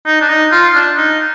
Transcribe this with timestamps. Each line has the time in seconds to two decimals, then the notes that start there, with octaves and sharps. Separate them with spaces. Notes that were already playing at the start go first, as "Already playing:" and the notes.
0.06 D#4
0.21 D4
0.29 D#4
0.52 F4
0.75 D4
0.98 D#4